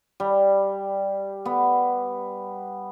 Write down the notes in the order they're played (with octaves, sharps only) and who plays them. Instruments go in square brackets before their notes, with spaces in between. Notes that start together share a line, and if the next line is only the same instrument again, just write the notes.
[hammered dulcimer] G3
B3